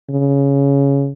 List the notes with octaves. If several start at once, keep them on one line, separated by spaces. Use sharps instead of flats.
C#3